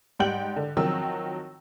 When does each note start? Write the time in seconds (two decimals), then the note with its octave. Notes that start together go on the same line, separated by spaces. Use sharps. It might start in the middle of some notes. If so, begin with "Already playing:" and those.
0.19 G#2 G3 F#5 G5 G6 F#7
0.56 D3
0.77 D#3 F3 F#3 C4 E6